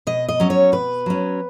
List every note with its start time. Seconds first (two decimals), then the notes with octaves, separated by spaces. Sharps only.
0.07 B2 D#5
0.28 D#5
0.40 F#3 C#4
0.50 C#5
0.72 B2 B4
1.06 F#3 C#4